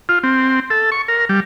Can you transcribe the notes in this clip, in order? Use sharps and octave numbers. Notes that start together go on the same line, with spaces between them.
F4
C4
A4
C#6
A#4
G3